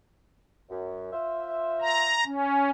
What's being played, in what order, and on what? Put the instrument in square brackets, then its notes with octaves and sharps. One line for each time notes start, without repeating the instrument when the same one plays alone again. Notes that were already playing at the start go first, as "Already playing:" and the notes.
[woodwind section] F#2
F4 C5 E5
[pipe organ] A#5
C#4